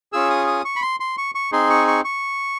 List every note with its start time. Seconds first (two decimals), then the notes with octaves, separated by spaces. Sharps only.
0.13 C#4 F4 G#4 E6
0.30 D#6
0.47 D#6
0.65 C#6
0.76 B5
0.82 C6
1.00 C6
1.18 C#6
1.35 C#6
1.52 C4 D#4 G#4 C6
1.70 C#6
1.87 C#6
2.04 C#6